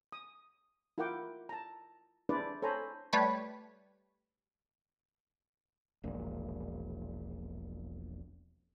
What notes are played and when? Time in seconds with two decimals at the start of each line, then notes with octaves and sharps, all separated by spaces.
0.12 D#6
0.98 E4 F4 A#4 F#5 G5 D6
1.49 A5 A#5
2.29 D4 E4 G#4 B4 C5 D5
2.62 A4 C5 C#5 G#5 A#5 B5
3.13 G3 A3 B4 C#5 B5
6.04 E1 A#1 A#2